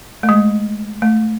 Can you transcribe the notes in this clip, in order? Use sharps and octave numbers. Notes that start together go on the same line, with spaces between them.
A3
G#3
A3